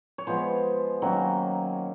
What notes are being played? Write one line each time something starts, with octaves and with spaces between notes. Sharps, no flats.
C#5
F3 G#3 B3 C5
D#3 F#3 A#3 C#4